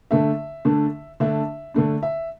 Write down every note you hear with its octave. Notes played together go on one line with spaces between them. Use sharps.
D3 A3 D4 E5
D3 A3 D4
D3 A3 D4 E5
D3 A3 D4
E5